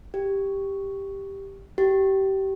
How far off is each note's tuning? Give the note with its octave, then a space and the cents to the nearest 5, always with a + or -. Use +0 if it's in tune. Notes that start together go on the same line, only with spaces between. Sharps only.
G4 +0
G4 -25